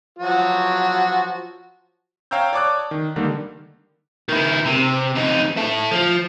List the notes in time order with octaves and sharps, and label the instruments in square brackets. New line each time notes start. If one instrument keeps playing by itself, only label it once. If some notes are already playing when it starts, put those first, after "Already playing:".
[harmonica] F3 F#3 F#4
[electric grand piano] C#5 F5 G5 A#5 E6 G6
C#5 D5 A5 D6 D#6 F#6
D#3
D3 D#3 G3 A#3 D#4
[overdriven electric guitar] D#3 E4
C3
F2 D#4
E4 A4
F3